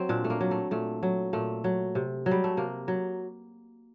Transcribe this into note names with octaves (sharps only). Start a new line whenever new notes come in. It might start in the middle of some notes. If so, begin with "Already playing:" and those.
Already playing: F#3 C4
A#2 D4
A3
A#3
F#3
A3
A#2 A3
F#3
A#2 A3
F#3
C3
F#3
G3
A3
C3 A#3
F#3